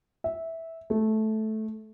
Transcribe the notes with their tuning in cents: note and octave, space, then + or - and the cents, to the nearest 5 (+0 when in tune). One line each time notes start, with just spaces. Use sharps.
E5 -10
A3 -10